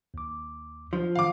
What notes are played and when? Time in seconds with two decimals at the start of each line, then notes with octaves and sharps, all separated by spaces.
0.14 D#2 D6
0.93 F3 D4
1.15 D#3 F5 F#5 D6